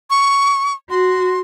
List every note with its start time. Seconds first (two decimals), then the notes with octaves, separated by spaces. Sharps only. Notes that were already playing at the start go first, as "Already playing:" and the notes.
0.10 C#6
0.90 F#4 C6